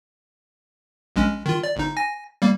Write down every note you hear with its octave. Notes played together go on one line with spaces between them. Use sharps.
A#1 G#3 C#4
D#3 F4
D5
G1 D#4
G#5 A#6
G3 A#3